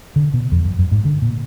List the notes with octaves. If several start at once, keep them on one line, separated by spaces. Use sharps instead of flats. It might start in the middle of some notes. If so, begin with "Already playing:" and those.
D3
B2
F2
F#2
F#2
G#2
D3
A#2